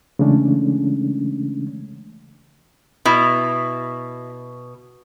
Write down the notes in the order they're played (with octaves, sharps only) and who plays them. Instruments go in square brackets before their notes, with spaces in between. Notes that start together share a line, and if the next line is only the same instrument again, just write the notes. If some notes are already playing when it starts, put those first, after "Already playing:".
[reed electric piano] C#3 E3 G#3 A3 C#4 D4
[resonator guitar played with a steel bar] B2 [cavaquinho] E4